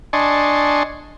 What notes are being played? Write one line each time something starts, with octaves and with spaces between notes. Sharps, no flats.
D4 D#5 G#5 A5 C6 C#6